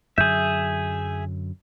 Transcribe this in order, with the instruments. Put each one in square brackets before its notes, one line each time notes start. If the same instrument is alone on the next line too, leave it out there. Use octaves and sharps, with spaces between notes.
[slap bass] F#2 D3 F#3 [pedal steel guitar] G#4 E5 [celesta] G6